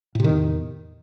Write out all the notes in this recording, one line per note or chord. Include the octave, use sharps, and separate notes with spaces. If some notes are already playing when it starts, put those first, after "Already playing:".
E2 A2 C3 D#3